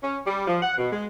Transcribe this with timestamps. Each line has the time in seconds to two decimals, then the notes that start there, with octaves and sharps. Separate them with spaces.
0.03 C#4
0.27 G3
0.47 F3
0.62 F#5
0.78 B2
0.92 G#3